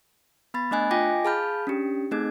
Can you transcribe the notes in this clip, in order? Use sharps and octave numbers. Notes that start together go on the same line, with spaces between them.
B3 B5 A6
A3 D4 D#5 G#5 F#6
F4 D#5 G5 G#5 D6 A#6
G#4 F5 A5 B5 F6 G6
C#4 D4 G4
A3 C4 D#4 G#4 G#6